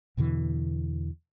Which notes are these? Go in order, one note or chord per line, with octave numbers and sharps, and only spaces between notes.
E2 B2 D3 E3